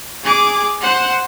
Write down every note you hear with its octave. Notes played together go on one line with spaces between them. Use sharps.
G#4 D6
C5 F#5